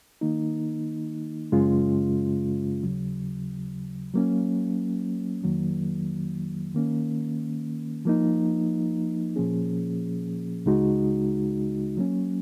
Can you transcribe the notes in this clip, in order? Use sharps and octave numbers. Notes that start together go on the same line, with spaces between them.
D#3 A#3 D#4
F#2 C#3 G#3 C#4 F4
D#2 C#3 F#3
F#3 A#3 C#4
F2 D#3 F#3 A#3
D#3 A#3 C#4
F3 A#3 D#4
A#2 F3 A#3 C#4 G#4
C#2 C#3 G#3 D#4 F#4
F#3 A#3 C#4